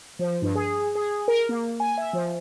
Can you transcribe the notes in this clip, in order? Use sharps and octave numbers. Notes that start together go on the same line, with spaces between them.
F3
G2
G#4
G#4
A#4
A#3
G#5
E5
F3